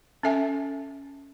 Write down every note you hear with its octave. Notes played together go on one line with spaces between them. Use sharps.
C#4 A4 E5 G#5